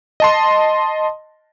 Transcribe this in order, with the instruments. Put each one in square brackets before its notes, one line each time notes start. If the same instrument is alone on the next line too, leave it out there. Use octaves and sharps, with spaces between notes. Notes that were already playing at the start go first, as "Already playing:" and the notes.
[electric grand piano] D#5 A5 C6